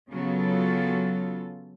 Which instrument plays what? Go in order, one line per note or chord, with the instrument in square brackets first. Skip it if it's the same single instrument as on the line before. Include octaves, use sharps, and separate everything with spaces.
[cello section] C#3 F#3 B3 F4 A4